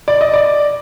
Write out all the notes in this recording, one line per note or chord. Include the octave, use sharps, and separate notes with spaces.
D5
D#5
D5